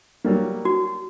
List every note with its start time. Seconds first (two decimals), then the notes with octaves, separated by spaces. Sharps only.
0.24 F#3 G3 A#3
0.65 F#4